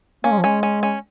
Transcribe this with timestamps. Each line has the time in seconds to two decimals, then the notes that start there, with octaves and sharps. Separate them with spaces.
0.24 A#3 C#4
0.32 G#3
0.38 F3
0.44 G#3 C#4
0.63 C#4
0.83 C#4